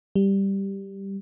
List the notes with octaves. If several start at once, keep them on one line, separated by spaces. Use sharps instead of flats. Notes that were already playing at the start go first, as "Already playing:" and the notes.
G3